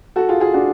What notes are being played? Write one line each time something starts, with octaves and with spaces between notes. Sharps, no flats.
F#4 A4
F4 G#4
F4 G#4
D4 F#4